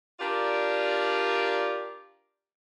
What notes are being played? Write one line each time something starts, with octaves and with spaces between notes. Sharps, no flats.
D4 F4 G4 A#4 D5